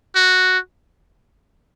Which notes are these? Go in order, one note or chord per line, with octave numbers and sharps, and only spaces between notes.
F#4